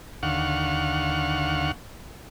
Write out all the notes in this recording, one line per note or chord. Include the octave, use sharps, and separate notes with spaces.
D#2 D3 F5 F#5 C#6